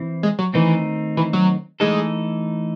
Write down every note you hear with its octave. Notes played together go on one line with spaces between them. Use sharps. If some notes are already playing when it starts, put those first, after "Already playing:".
Already playing: E3 C4 E4
G#3
F#3
D#3 E3 A3 C4 D#4
E3
F#3
E3 G#3 A3 D#4 A4